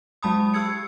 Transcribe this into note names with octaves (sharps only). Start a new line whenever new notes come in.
F#3 G#3 A5 B5 D#6
G4 E6 G#6 C#7